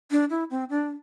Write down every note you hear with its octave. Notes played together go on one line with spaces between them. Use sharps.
D4
E4
C4
D4